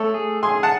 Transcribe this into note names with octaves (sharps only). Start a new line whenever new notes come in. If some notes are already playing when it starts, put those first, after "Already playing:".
Already playing: A3 A4 C#5
G#4
G#4 G#5 C6
F#5 A5